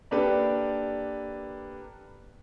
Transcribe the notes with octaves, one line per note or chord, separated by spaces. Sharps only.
A#3 D4 G4 A4 B4